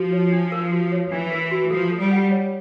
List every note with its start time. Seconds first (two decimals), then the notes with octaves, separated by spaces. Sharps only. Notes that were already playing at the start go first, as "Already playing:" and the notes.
Already playing: F3 F#4
0.12 C#5
0.32 D4
0.52 A#4
0.72 F#4
0.92 C#5
1.11 E3 D4
1.32 A#4
1.51 F#4
1.71 F3 A4
1.91 A4
2.00 G3
2.11 F#5
2.31 C#5